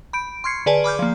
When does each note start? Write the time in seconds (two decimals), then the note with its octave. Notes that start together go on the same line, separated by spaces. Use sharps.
0.13 B5 G6 D7
0.44 C6 C#6 F6 G#6 C7 C#7
0.66 D3 G#4 B4 D5 G#5 A5
0.84 B5 D6 F6 G6
0.99 F3 A#3